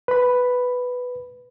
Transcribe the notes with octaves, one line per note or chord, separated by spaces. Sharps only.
B4 B5